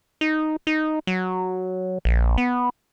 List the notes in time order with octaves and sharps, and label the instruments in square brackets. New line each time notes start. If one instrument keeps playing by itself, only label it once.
[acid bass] D#4
D#4
F#3
A#1
B3